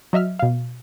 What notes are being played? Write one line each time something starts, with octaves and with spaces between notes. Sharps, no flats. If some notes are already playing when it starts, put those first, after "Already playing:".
F#3 D#5 E5 F6
B2 F5